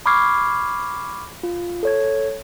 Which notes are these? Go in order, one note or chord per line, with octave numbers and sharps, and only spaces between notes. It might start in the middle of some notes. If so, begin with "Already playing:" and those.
B5 C#6 D6 F6 G#6 C7
F4
A4 C#5 G#6